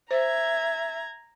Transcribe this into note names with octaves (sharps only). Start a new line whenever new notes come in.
C5 E5 A#5 G#6